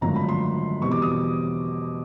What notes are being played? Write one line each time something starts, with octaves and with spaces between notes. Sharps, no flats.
G#1 F#2 D3 F3 A3 A#5
B5
C6
E2 B2 G3 C4 C#6
D6
D#6